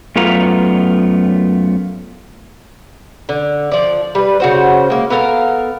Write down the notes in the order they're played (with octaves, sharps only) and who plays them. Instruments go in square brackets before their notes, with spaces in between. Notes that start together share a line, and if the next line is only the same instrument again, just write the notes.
[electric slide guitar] F#2 A3 B3 F4 A#5
[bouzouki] D3
F3 D5
G3 B4
C#3 F#4 C5
G#3 A#3
B3 A4 A#4 F5